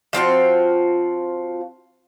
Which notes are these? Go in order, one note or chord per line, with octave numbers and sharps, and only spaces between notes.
F3 C4 F4 F#4